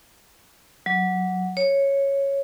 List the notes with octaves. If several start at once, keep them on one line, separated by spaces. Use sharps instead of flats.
F#3
C#5